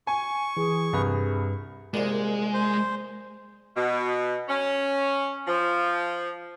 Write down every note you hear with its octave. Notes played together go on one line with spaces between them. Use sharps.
G#5 C#6
E3 G#4
C2 G2 B4
C2 A#2 G#3
C5
B2
C#4
F3